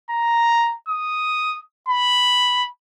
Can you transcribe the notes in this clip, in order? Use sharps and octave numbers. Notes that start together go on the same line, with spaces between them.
A#5
D#6
B5